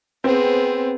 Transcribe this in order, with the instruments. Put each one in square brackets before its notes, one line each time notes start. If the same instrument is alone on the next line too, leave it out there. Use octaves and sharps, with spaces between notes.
[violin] B3 G#4 [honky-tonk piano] C4